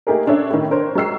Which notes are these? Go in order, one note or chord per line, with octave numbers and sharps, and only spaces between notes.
A3 A#3 D#4 G4 G#4 A#4
C#4 D4 A4 C#5 E5
A2 D#3
D4 A#4 C5 C#5
F#3 G#3 E6 C7